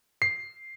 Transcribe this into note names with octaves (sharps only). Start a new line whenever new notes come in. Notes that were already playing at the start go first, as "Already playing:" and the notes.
C7